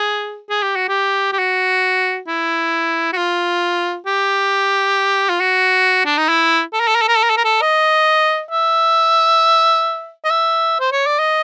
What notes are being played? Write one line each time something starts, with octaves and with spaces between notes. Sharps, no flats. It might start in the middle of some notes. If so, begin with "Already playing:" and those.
Already playing: G#4
G#4
G4
F#4
G4
G4
F#4
E4
F#4
F4
G4
F4
F#4
D4
D#4
E4
A4
A#4
A4
A#4
A4
A#4
A4
A#4
A4
A#4
A4
D#5
E5
D#5
E5
C5
C#5
D5
D#5